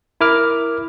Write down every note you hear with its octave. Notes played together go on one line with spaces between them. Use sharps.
E4 A#4 D6 F6